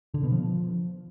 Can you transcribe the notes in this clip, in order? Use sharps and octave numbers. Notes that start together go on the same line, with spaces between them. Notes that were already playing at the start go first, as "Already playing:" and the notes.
D3
B2
F3